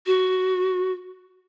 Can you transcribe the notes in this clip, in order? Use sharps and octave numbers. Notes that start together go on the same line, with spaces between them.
F#4